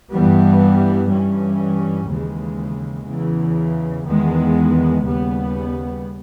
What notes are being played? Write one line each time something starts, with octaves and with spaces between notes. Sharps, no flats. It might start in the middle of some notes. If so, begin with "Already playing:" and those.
G2 E3 G3 B3
G2 E3 G3 C#4
D#2 C#3 E3 G#3
E2 C#3 E3
E2 D#3 G#3 B3
D#2 C#3 G3 B3